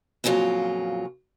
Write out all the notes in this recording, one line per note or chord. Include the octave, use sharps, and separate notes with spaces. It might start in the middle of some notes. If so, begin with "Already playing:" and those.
F2 A#2 C#3 F#3 F4